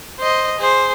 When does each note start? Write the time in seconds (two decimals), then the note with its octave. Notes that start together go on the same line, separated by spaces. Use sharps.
0.19 C5 D#5
0.59 G#4 C5